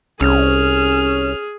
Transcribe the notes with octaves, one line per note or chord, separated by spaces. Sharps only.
C2 C#4 G#4 F6